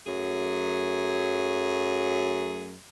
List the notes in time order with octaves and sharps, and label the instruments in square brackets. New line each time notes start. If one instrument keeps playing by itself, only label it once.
[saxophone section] F#2 F#3 A3 G#4